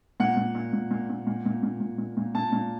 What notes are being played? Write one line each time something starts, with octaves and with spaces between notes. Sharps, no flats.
A#2 F#5
A#2
A#2
A#2
A#2
A#2
A#2
A#2
A#2
A#2
A#2
A#2
A#2 A5
A#2